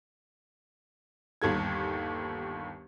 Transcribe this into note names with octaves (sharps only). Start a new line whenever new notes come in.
G1 D#2 A4 G#6